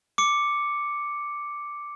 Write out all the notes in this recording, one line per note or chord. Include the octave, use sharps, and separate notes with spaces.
D6 C#7